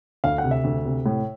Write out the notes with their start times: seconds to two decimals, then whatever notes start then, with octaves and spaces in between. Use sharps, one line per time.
0.24 D2 F5
0.38 F#5
0.44 C3
0.51 E5
0.64 D2
0.85 C3
1.06 A2